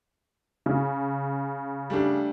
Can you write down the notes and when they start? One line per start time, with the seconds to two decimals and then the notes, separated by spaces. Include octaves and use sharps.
0.66 C#3
1.90 G3 A3 D4